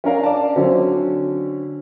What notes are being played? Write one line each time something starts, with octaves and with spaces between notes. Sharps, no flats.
C#4 D4 A#4 F5
D5 A5
D3 F#3 C4 C#4